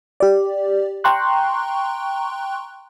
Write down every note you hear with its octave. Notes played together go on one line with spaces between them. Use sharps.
G4 D5
G5 A#5 C6 C#6 F#6